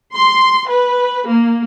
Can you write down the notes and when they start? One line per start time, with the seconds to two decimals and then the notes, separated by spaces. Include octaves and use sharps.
0.12 C6
0.67 B4
1.25 A#3